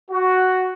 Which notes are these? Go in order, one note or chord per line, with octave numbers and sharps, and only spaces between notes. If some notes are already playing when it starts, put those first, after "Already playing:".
F#4